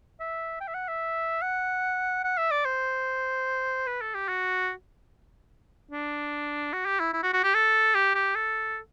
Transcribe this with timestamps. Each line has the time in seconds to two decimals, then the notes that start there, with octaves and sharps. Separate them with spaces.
0.20 E5
0.61 G5
0.68 E5
0.74 F#5
0.88 E5
1.42 F#5
2.24 F#5
2.37 E5
2.51 D5
2.65 C5
3.87 B4
4.01 A4
4.14 G4
4.28 F#4
5.91 D4
6.73 F#4
6.85 G4
6.99 E4
7.13 E4
7.23 F#4
7.33 F#4
7.43 G4
7.54 A4
7.95 G4
8.15 G4
8.35 A4